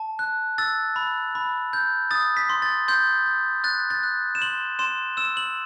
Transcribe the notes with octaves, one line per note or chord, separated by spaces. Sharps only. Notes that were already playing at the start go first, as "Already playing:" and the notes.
Already playing: A5
F#6
E6 A6
B5
B5
G6
D#6 A6
B6
C6
A6
C6 G6
G6
F#6 A6
A6
F#6
E7
C6 F#7
C6 E7
E6 E7
F#7